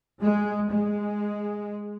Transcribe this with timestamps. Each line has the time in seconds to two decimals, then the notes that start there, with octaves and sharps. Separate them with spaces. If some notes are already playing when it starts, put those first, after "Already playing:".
0.21 G#3
0.70 G#3